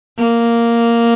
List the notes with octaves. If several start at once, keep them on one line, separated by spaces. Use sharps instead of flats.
A#3